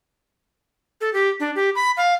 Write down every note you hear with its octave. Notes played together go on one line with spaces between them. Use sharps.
A4
G4
D4
G4
B5
F5